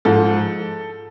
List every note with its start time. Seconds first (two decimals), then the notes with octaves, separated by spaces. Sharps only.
0.05 G#2 F3 A4